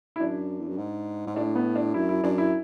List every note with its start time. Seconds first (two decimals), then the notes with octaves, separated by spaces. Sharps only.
0.16 E4
0.20 F#2 D4
0.60 E2
0.68 F#2
0.78 G#2
1.27 G#2
1.36 A2 D4
1.55 B3
1.76 D4
1.94 F#2 E4
2.09 E4
2.23 F#2 D4
2.38 E4